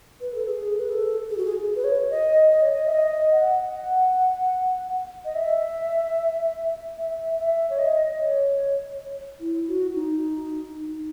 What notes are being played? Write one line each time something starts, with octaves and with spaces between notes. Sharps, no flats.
B4
A4
G#4
B4
A4
G#4
F#4
G#4
B4
C#5
D#5
D#5
C#5
D#5
E5
D#5
F#5
F#5
D#5
E5
E5
E5
C#5
D#5
C#5
E4
F#4
D#4